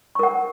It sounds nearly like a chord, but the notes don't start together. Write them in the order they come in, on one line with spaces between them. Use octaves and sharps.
C#6 A#4 F#5